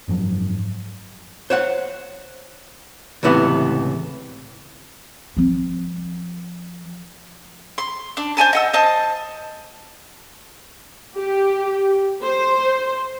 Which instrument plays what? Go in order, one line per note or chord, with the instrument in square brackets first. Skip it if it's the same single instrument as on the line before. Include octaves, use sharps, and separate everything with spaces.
[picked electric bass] F#1 G#2 F3 F#3
[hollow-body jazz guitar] C5 C#5 F#5
C#2 A2 C3 E3 B3 F#5
[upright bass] F3 C4
[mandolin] C6
D4
C5 D5 G#5 A5
D#5 F#5 E6
C5 D#5 A5
[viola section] G4
C5